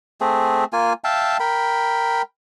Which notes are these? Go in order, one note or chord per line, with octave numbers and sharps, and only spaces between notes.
A3 C4 G#4
A#3 F4 G#5
E5 F5 G5 A5
A#4 G5 B5